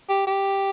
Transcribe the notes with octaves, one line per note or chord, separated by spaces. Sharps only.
G4
G4